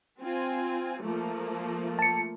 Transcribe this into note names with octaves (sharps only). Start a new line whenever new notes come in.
C4 F4 G#5
F3 A3 A#3
A5 C#7